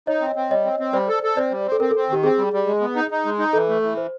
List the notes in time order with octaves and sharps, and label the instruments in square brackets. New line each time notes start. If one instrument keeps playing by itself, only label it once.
[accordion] D#4 [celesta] C#5 D#5
[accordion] C4
C4
[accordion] G3 [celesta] C#5 D#5
[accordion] C4
C4
[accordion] G3 [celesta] C5 D5
[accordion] A4
A4
[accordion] C4 [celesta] C5 D5
[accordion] G3
C4
[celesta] A4
[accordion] C4 [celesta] A#4
[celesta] A4
[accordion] C4
[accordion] D#3 [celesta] G4
[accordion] C4 [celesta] G#4
[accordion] G3
G3
G#3
B3
D#4
D#4
G#3
D#4
[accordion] E3 [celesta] A4
[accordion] A3
E3
[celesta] C5